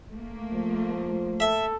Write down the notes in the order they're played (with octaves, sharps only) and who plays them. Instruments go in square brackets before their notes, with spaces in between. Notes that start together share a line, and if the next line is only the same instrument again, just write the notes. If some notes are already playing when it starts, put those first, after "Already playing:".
[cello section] A3 A#3
[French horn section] F3
[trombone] A4 [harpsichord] E5